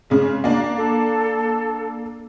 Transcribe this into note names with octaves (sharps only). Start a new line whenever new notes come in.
C#3 G#3
A#3 D4
A4